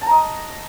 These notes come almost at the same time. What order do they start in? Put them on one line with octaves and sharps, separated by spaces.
A5 A#5 D#5